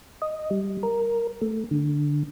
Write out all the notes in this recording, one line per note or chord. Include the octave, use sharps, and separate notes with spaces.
D#5
G3
A#4
A3
D3